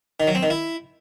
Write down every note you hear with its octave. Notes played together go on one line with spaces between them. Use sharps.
D#3
F#3
C4
D#3
E4